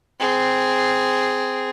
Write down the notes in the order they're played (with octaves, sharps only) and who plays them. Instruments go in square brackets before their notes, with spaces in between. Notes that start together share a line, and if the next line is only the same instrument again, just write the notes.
[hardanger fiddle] C4 G#4